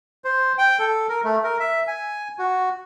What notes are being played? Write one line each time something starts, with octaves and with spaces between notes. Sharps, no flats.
C5
G5
A4
A#4
A3
A#4
E5
G#5
F#4